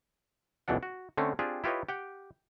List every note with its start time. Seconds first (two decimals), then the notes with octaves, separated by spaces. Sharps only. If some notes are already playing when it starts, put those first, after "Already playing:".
0.68 G1 C#2 B2 E3 D4 F#5
0.83 F#4
1.17 D3 A3 C4 C#4
1.39 C4 D4 F4 G4 G#4
1.64 E4 F4 G4 B4 C#5 D#5
1.89 G4 F#5 G5